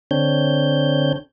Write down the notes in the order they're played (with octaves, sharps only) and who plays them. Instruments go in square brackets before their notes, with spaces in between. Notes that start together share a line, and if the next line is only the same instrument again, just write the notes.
[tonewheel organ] D3 C4 D4 C#5 G6